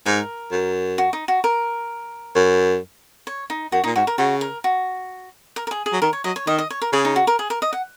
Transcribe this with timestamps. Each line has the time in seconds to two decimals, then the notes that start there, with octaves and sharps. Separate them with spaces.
0.06 G#2 A#4
0.51 F#2
0.98 F#4
1.13 D#4
1.28 F#4
1.44 A#4
2.35 F#2
3.27 C#5
3.50 D#4
3.72 F#2 F#4
3.84 A#2 D#4
3.96 G#2 F#4
4.07 A#4
4.18 C#3 F#4
4.41 A#4
4.64 F#4
5.56 A#4
5.67 A#4
5.71 G#4
5.86 G#4
5.93 F#3
6.02 D#3 A#4
6.13 C#5
6.24 F#3 D#5
6.36 C#5
6.47 D#3 D#5
6.58 D#5
6.70 C#5
6.82 A#4
6.92 C#3 G#4
7.05 D#4
7.16 F#4
7.27 A#4
7.39 G#4
7.50 A#4
7.62 D#5
7.73 F#5